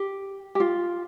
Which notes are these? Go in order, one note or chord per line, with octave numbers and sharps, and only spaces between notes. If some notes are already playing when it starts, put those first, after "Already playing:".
Already playing: G4
G4
F4